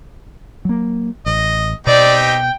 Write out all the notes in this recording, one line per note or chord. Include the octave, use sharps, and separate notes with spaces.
F#3 A#3
A1 D#5
B2 C4 D#4 G4 D5
G5